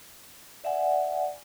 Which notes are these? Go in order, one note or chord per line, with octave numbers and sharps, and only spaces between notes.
D5 E5 F#5 G#5